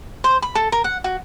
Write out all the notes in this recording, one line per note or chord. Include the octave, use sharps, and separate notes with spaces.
C5
B5
A4
A#4
F#5
F#4